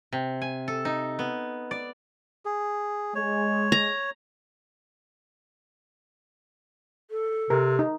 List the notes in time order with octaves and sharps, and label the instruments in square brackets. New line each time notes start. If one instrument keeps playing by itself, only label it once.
[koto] C3
G#5
A4
D#4
B3
D5
[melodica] G#4
[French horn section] G#3 [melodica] C#5
[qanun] A#5
[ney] A4
[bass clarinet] C3 [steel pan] A#4
[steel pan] D#4